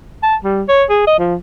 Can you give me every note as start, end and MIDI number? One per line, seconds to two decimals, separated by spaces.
0.23 0.36 81
0.44 0.63 55
0.68 0.84 73
0.89 1.03 68
1.07 1.18 75
1.18 1.35 53